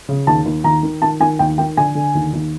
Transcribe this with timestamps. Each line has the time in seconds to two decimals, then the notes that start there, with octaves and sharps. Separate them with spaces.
0.09 C#3
0.27 D#2 A5
0.45 D#2
0.64 D#2 A#5
0.83 D#3
1.02 D#3 A5
1.20 D#3 G#5
1.39 D#2 G5
1.58 D#3 G5
1.77 D3 G#5
1.95 D3
2.15 D#2
2.33 D#2